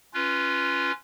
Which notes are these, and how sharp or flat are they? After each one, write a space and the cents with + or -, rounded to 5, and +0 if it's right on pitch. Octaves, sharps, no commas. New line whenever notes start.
C#4 +0 F4 -20 B4 +0